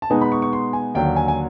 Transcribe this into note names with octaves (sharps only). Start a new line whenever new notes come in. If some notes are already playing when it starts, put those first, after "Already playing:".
A5
B2 G#3 B3 D#4 G#5
B5
C#6
C#6
C6
G#5
D#2 D3 F#3 G5
G#5
G#5